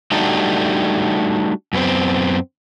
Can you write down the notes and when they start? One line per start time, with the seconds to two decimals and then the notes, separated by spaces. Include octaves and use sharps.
0.12 G3 A3 D4 D#4 F#4 G4
1.73 F#2 B3 C4